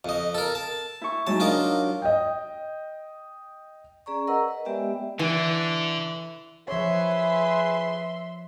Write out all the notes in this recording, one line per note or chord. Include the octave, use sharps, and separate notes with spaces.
F2 D#5
A4 A#4
A5
E4 C#6
F#3 G#3 D#4 A5
D4 F4 A#4 D#5
D#5 G5
C#4 G#4 D5 A#5 C#6
A#4 B4 D#5 F#5 A#5 E6
B4 D#5
G#3 B3 G4 D5 E5 G5
D3 E3
F3 G#4 B4 C#5 E5 C6